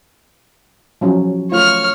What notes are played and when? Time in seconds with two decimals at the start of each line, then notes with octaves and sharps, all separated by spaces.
1.01 F3 F#3 C#4
1.52 A3 F4 C#5 F6